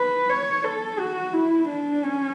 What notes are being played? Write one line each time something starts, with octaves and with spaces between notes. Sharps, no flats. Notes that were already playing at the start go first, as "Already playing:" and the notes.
Already playing: B4
C#5
A4
F#4
E4
D4
C#4